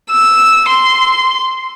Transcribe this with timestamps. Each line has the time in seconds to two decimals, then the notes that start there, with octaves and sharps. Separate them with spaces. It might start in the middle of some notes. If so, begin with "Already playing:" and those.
0.10 E6
0.69 C6